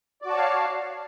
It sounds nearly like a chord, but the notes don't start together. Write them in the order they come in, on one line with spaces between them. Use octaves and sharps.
D5 F#4 A5 C#5 F5